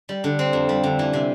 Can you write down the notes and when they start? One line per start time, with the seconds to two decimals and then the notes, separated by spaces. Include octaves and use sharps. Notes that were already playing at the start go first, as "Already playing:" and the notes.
0.09 G3
0.24 D3
0.39 C4
0.53 F2
0.69 G3
0.83 D3
0.99 E3
1.13 C3